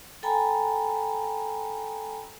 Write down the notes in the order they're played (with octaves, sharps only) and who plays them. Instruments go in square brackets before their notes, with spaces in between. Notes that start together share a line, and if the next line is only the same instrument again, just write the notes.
[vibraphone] A4 G5 G#5 A#5 B5